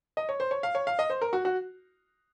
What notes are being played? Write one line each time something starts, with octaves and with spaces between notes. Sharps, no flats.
D#5
C#5
C5
C#5
F5
C#5
F5
D#5
C5
A#4
F#4
F#4